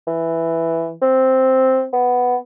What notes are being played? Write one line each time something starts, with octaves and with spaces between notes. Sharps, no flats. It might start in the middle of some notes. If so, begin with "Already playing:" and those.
E3
C4
B3